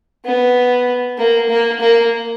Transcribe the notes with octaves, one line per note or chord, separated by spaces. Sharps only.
B3
A#3
A#3
A#3